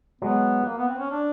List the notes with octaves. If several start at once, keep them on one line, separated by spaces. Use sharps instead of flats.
F#3 G#3 B3
A#3
B3
C4
C#4
D4